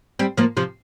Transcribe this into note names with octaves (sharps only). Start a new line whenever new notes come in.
G3 C4
F3 A#3
C3 F3